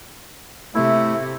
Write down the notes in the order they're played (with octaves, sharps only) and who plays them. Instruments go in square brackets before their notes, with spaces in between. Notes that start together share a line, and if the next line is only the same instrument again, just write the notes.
[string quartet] C3 [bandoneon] A3 [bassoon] E4